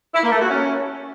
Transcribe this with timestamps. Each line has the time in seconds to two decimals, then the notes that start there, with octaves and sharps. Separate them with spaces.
0.14 E4
0.23 A#3
0.32 A3
0.41 F#4
0.49 C#4